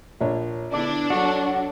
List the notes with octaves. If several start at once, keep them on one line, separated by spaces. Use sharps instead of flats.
A#1 D4 C#5
D3 B3 D4 E4 D5 D6
F#3 F#4 A4 D5